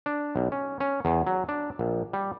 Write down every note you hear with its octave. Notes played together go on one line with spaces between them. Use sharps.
D4
B1
C#4
C#4
E2
F#3
D4
A#1
G3